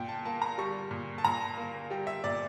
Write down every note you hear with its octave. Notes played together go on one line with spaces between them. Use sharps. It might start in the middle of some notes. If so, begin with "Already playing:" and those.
Already playing: A#2 G5
A5
A#3 A5
A#5
G3 C#6
A#2
A5
A#2 A#5
A#3
G3 G5
E5
A#2 D5